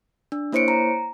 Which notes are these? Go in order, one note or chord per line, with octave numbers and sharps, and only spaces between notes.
D4
A#3 E4 C5 C#5 C#7 D7
A#5